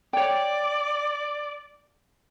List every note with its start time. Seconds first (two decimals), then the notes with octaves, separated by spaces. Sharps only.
0.13 C#5 D5 G5